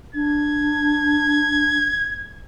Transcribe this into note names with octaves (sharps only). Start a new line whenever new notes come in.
D4 G#6